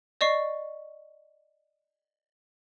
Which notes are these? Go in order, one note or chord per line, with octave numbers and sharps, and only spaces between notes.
D5 D#5 C#6 C7